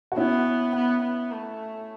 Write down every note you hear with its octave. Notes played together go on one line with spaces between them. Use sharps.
F#4
B3 C#4 E4
B3
B3
A3